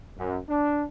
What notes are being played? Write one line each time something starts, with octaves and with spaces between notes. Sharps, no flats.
F#2
D4